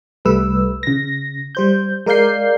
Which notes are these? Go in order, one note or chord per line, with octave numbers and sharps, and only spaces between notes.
C2 G3 A3 B4 E6
C#3 A#6
G3 C5 G6
G#3 A#4 D5 F5 G6 C7